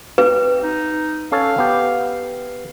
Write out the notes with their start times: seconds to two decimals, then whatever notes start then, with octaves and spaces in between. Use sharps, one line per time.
0.18 C4 B4
0.63 D#4
1.32 C#4 A4 C#5 F5
1.58 B3 G4